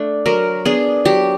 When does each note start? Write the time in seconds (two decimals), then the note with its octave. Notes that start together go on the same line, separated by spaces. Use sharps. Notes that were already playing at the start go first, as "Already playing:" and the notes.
Already playing: A3 D4
0.26 F#3 A#4
0.65 B3 D4 G#4
1.05 F#3 G4